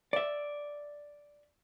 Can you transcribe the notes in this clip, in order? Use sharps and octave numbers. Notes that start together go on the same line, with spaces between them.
D5 E5